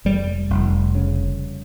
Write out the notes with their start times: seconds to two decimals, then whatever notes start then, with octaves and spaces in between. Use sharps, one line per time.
0.05 F1 G3
0.50 F1
0.95 C#3